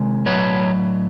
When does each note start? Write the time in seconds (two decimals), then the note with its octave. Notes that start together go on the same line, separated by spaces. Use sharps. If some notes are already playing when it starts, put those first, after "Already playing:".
Already playing: C3 D#3 G#3
0.26 A2 F#3 B4 C#5